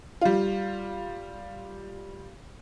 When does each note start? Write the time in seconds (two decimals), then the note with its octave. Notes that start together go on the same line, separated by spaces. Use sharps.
0.21 G3 F4